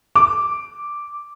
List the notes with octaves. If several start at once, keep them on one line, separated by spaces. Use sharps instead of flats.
D6